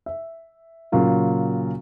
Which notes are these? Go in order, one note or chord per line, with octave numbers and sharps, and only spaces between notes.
E5
A#2 C#3 F#3 F4 A#4